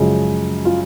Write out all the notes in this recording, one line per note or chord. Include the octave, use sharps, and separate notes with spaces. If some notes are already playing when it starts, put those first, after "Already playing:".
Already playing: F#2 C#3 F3 G#3
F4